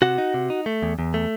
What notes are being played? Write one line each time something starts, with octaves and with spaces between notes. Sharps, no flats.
C3 F#4 F#5
D#4
C3
D#4
A3
E2
E2
A3